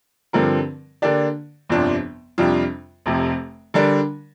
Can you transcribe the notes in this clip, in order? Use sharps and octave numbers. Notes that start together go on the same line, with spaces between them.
G2 D3 F3 C4 A#4
D3 A#3 D4 G4 D5
G1 F2 C3 F3 D4
F2 C3 G3 D4 F4
F1 F2 C3
D3 G3 D4 A#4 D5